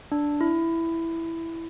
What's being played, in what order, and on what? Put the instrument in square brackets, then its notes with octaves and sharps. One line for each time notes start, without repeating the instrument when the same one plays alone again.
[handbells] D4
E4